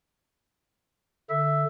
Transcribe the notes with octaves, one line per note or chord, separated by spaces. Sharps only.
D3 E5